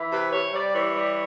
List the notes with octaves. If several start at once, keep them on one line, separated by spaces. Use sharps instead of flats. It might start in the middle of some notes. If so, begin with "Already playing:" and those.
Already playing: E3
C3 B4
C3 C#5
G3 D5
E3 C#5
G3